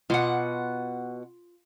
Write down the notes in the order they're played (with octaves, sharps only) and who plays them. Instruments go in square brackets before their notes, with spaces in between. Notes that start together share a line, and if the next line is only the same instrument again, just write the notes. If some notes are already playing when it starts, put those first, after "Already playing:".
[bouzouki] B2 F#5 [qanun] F4 C6 D6